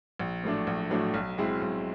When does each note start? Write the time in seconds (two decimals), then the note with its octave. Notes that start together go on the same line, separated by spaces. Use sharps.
0.20 A#1
0.43 A2 F#3 A3 D4
0.67 A#1
0.90 A2 F#3 A3 D4
1.14 B1
1.38 B2 G#3 C4 E4
1.62 B1